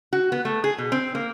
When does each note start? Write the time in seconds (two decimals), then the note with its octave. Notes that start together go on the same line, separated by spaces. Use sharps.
0.13 F#4
0.32 B3
0.45 A3
0.64 G#4
0.78 B2
0.92 C4
1.15 A#3